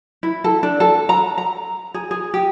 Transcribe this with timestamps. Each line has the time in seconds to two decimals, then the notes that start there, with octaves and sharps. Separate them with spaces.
0.23 E4
0.44 A4
0.63 D4
0.80 A4
1.09 A#5
1.38 A#5
1.94 G#4
2.11 G#4
2.34 G4